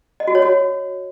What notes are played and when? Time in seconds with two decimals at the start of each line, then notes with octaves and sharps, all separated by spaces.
0.20 D#5
0.28 F#4
0.35 C#5
0.42 F#4